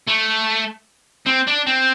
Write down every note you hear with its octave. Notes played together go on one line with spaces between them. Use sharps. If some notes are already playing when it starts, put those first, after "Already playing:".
A3
C4
D4
C4